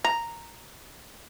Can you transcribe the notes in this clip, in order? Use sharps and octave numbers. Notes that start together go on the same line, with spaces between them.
A#5